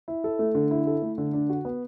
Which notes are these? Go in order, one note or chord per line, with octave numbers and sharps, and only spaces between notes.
E4
A4
A3
D3
E4
A4
A3
D3
D4
F#4
B3